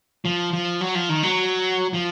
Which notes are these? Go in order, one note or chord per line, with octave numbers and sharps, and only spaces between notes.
F3
F3
F#3
F3
D#3
F#3
F3